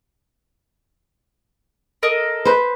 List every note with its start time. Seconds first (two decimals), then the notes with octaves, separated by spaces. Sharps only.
2.03 A4 A#4 D#5
2.45 B4 C5